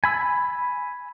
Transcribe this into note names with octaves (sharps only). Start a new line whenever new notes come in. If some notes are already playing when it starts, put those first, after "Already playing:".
G#5 B5 E6